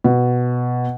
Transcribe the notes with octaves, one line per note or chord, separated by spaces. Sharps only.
B2